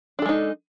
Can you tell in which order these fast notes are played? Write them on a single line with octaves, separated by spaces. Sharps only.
D4 A4 G#3 D#4